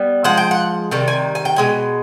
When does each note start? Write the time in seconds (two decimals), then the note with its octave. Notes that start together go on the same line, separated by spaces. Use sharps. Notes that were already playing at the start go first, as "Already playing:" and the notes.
Already playing: G3 B3
0.24 F3 G#3 F#5
0.37 G5
0.51 F#5
0.91 C3 D#3 G3
1.08 G#5
1.35 G#5
1.45 G5
1.56 B2 G#3 G#5